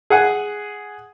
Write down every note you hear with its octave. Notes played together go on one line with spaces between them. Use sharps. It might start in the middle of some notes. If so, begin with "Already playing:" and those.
G#4 F#5 G#5